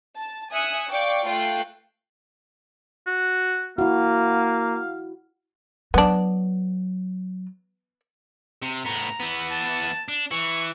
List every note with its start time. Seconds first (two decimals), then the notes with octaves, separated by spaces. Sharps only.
0.16 A5
0.52 E5 G#5 D#6 F#6 C#7
0.90 D5 F5 G5 C#6 D6
1.26 A3 F4 G5 F#6 C7
3.07 F#4
3.78 A#3 E4 F#4 F5
5.94 F#3 B3 D4
8.62 C3
8.85 A2 B3 A#5
9.20 E3 B3
9.51 A5
10.08 D4
10.31 E3 C#6